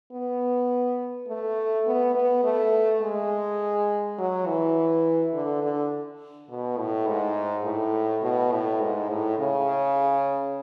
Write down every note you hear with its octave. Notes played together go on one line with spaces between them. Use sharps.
B3
A3
B3
B3
A3
G#3
F#3
E3
D3
D3
B2
A2
G#2
A2
B2
A2
G#2
A2
C#3